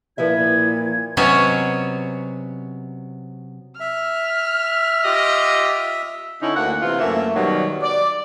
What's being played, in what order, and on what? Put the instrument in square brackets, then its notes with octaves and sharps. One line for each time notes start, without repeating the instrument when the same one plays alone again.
[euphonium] A#2 [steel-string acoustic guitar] F3 B4 E5 [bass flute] E4 [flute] G#6
[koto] C3 F#3 B3 C#4 C#5 D#5
[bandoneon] E5 [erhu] F6
[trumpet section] F4 G4 D#5
[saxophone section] D3 C#4 D#4 E4
D2 A#3 F#5
C3 E3 F4
F#2 A3 A#3 E5
B2 D#3 F#3 G3
D5